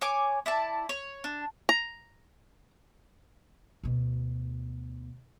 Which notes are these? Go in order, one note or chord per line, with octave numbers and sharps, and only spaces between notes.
C#5 G#5 D6
E4 D5 A5
C#5
D4
A#5
D2 B2